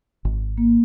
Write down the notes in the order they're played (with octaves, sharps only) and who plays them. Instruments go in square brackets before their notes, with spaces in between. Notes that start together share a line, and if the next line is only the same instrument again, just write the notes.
[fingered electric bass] G#1
[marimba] A#3